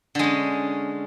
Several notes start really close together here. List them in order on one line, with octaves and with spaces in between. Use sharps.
D3 G#3 C#4